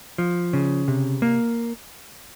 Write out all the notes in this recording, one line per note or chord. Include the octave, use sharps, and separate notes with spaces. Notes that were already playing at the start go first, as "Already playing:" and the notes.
F3
C#3
C3
A#3